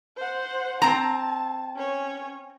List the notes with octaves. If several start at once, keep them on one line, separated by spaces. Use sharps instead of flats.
C5 F#5
C4 A5 A#5
C#4 C#5